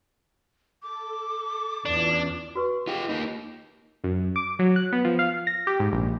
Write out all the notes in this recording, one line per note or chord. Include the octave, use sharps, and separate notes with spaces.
A4 D6
E2 C#4 D4 E4 F4
F#4 B4 C#6
F4 G4 G#4 D#5
A#3 D#4 F4
F#2
D6
F#3
F#6
B3
F3
F5
A#6
G4
G#2
A#1